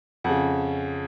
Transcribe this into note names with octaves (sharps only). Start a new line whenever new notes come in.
F2 C#3 F#5